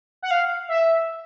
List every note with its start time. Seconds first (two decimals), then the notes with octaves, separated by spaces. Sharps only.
0.22 F#5
0.31 F5
0.69 E5